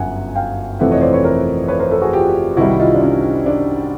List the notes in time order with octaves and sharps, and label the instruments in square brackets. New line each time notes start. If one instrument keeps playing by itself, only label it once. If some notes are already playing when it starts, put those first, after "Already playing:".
Already playing: [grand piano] G1 F#2 E5 F#5 G#5
F5 G5
F2 C3 E3 A3 C4 E5 F#5
C#5 D#5
C5 D5
B4 C#5
A#4 C5
B4 C#5
A#4 C5
A4 B4
F#4 G#4
F4 G4
C2 C3 D#3 G3 E4 F#4
D#4 F4
D4
C#4 D#4
D4